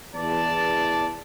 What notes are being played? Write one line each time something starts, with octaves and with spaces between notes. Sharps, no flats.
E2 D5 A5